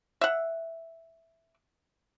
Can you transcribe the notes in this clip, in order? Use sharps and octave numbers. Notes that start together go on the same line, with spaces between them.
E5 F#5